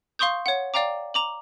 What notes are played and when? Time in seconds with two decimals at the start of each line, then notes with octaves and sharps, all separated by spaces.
0.19 F5 C6 C#6 D#6 G6
0.46 C#5 F#5
0.74 D5 F5 G5 A#5 D6
1.14 A#5 D6 F#7